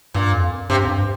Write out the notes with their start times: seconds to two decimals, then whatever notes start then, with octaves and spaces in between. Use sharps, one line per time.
0.14 G2 A#2
0.33 F2
0.69 G2 C3
0.83 F2
0.88 G2